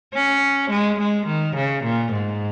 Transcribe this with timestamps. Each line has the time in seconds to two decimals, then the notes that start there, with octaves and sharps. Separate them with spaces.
0.14 C#4
0.70 G#3
1.00 G#3
1.27 D#3
1.56 C#3
1.84 A#2
2.13 G#2